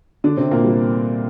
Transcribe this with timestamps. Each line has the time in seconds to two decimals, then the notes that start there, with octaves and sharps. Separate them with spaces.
0.24 D3 D4
0.37 C3 C4
0.51 A#2 A#3
0.64 G3